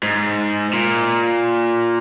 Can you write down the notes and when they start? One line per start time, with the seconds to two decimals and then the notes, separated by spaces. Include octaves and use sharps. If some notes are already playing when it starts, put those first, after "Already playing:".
0.03 G#2
0.73 A#2